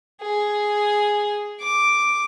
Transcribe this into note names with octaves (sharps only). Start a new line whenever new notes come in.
G#4
D6